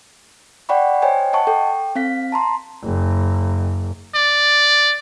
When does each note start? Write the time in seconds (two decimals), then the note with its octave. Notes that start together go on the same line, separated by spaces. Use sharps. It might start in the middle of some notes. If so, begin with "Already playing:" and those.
0.69 D5 F#5 G5 B5 C#6
1.02 C5 C#5 D#5 G5 G#5
1.33 D#5 F#5 A5 C#6
1.47 A4 G5
1.95 C4 F5 B6
2.32 A5 A#5 C6
2.83 F#1
4.15 D5